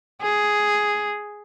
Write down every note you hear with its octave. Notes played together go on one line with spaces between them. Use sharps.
G#4